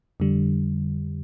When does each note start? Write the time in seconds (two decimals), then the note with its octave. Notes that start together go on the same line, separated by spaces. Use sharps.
0.20 F2 D3 G3